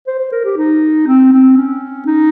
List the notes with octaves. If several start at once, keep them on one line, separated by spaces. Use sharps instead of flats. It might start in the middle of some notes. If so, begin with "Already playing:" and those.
C5
C5
A#4
G4
D#4
C4
C4
C#4
D#4